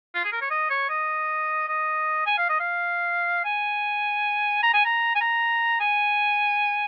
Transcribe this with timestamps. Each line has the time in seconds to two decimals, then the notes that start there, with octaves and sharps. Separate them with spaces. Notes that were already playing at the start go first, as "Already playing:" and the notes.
0.15 F4
0.24 G#4
0.32 A#4
0.41 C#5
0.50 D#5
0.70 C#5
0.89 D#5
1.68 D#5
2.26 G#5
2.38 F5
2.49 D#5
2.60 F5
3.45 G#5
4.63 A#5
4.73 G#5
4.85 A#5
5.15 G#5
5.21 A#5
5.80 G#5